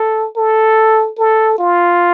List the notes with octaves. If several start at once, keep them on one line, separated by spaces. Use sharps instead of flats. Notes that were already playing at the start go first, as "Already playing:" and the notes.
Already playing: A4
A4
A4
F4